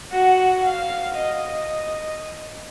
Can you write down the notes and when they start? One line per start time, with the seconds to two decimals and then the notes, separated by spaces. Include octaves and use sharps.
0.11 F#4 F#5
0.64 F5
1.16 D#5